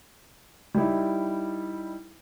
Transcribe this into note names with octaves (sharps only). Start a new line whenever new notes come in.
G3 D#4 E4